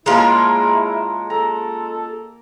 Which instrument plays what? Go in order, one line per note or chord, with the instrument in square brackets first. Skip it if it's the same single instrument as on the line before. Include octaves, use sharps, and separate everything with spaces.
[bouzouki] G#3 C#4 F4 [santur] A#3 A#4 A5 [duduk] E4
[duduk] A4 [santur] A#5